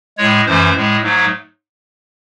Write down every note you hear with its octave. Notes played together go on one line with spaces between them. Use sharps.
A2 G#3 C#5
F#2 E3 A3 C5
A2 G#3
G#2 F#3 A3